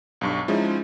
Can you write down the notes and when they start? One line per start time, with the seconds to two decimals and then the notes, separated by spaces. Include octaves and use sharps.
0.21 B1 G2 C#6
0.48 F3 G#3 C#4 D#4 E4